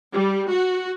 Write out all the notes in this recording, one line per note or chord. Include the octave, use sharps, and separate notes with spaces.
G3
F#4